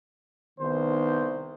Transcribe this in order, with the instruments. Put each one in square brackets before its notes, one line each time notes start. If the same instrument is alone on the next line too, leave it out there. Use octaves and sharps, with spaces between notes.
[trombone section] C2 C5 [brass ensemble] D#3 B3